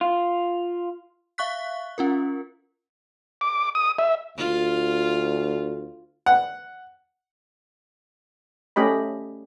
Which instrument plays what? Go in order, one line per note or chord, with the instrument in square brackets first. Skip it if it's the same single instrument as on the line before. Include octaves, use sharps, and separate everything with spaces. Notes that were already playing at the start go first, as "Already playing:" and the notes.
[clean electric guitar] F4
[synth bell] E5 F5 C#6 F#6 B6
C#4 F4 A#4
[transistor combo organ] D6
D#6
E5
[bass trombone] D2 [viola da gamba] F4
[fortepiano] F#5
[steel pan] A3 C#4 G4 D#5 B5